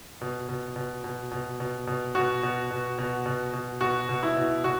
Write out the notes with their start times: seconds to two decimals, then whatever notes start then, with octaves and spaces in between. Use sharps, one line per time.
0.21 B2
0.49 B2
0.76 B2
1.04 B2
1.31 B2
1.60 B2
1.87 B2
2.15 B2 F#4
2.43 B2
2.71 B2
2.98 B2
3.26 B2
3.53 B2
3.81 B2 F#4
4.09 B2
4.23 E4
4.37 B2
4.64 B2 F#4